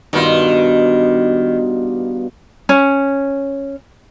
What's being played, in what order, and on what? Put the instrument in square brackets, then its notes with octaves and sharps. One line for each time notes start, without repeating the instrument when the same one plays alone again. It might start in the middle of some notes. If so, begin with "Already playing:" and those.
[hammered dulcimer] G2 B2 F4 [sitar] D#3
[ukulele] C#4